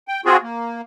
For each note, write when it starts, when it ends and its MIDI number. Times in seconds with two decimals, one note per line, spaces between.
0.08 0.21 79
0.25 0.37 60
0.25 0.37 65
0.25 0.37 66
0.25 0.37 68
0.43 0.81 58